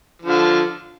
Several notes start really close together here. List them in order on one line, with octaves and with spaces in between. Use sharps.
F3 D3 F4